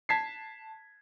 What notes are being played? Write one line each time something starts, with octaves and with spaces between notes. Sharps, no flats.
A5 G#6 B6 C7